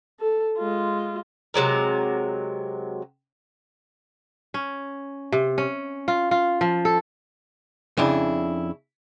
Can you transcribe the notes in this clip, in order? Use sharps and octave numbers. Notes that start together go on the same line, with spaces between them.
A4
G#3 F4
C3 F#3 G#3 A#4
C#4
C3
C#4
F4
F4
F3
A4
F2 C#3 D4 E4